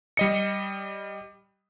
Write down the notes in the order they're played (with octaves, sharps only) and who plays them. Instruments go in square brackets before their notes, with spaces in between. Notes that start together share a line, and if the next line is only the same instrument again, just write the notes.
[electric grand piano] G3 D#5 C#7